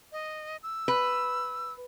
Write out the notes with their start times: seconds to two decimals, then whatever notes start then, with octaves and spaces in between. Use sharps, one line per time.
0.12 D#5
0.63 E6
0.88 B4